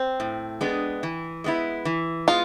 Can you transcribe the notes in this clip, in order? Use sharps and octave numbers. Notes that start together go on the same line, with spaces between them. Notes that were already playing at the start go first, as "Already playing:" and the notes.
Already playing: C4
A2
G#3 B3 D4
E3
G#3 B3 E4
E3
G#3 B3 F4